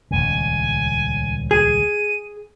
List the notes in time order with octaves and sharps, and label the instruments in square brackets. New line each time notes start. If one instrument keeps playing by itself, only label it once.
[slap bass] D#1 C#2 C#3 [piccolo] G#5
[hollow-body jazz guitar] G#4 [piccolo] D#7